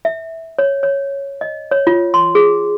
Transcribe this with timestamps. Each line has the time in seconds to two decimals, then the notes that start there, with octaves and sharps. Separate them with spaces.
0.05 E5
0.59 C#5
0.83 C#5
1.41 D#5
1.71 C#5
1.87 F4
2.14 C6
2.35 G#4